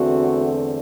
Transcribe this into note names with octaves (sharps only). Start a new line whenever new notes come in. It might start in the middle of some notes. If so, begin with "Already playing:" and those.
Already playing: E2 D3 A3 C4 F#4